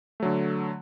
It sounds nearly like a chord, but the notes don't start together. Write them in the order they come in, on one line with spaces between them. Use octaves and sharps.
A3 F#3 D3